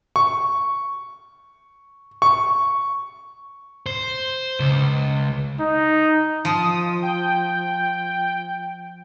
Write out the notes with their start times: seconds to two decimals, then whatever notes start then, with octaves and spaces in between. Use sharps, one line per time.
0.16 C#6
2.22 C#6
3.86 C5
4.60 C#2
5.60 D#4
6.45 F3 D#6
7.02 G5